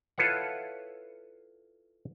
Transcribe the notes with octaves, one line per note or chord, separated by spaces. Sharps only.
E4 F4 A4 B4 C#5 F#5